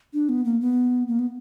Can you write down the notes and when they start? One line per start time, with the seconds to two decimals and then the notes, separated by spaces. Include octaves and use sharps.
0.13 D4
0.29 B3
0.45 A#3
0.61 B3
1.08 A#3
1.19 B3